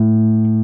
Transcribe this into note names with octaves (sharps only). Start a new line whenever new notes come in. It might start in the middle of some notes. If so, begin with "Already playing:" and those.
Already playing: A2